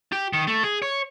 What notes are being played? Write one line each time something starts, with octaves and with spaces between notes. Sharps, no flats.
G4
D#3
A3
G#4
C#5